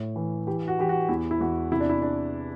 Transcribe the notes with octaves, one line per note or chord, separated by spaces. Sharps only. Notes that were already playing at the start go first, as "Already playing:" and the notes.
Already playing: A2
E3
E3 G4
F#4
E3 G4
F#4
E2 E4
E4
E2 F#4
C3 E4
D4
E4
D4